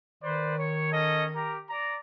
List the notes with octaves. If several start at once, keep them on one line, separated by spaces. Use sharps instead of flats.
D#3 B4 C5 D5
C#5
C#4 A4 D#5
G4 A#4 A#5
D5 A#5